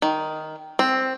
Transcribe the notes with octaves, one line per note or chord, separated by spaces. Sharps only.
D#3
C4